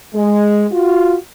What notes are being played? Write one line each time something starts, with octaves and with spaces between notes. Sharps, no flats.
G#3
F4 F#4